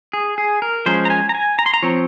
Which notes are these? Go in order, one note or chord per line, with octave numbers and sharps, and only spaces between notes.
G#4
G#4
A#4
F3 G#3 C#4 C5
A#5
G#5
A#5
G#5
A#5
C6
A#5
F3 C4 C#5